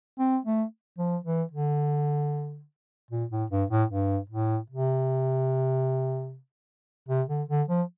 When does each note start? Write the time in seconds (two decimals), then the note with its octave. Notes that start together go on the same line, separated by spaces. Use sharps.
0.19 C4
0.45 A3
0.99 F3
1.25 E3
1.52 D3
3.11 A#2
3.31 A2
3.51 G2
3.70 A2
3.90 G2
4.30 A2
4.70 C3
7.09 C3
7.29 D3
7.49 D3
7.69 F3